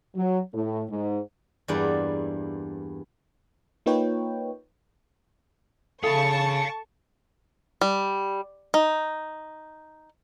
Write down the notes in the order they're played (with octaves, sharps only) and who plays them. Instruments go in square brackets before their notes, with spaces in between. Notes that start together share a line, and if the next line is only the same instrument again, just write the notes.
[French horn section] F#3
A2
G#2
[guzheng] E2 G2 A#3 E4 D5
[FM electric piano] A#3 D#4 F4 B4 C#5 G5
[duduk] C#3 [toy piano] A4 E5 B5 [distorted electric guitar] F5 G#5 [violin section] A5 C#6
[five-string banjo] G3
D#4